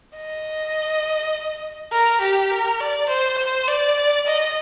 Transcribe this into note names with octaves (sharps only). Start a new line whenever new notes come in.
D#5
A#4
G4
A#4
D5
C5
C5
D5
D#5